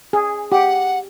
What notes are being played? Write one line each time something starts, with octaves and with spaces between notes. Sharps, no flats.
G#4
G4 F#5